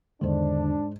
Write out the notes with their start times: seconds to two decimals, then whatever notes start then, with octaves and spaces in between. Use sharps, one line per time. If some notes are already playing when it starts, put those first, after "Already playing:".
0.21 E2 G#2 D3 D#3 D4 C5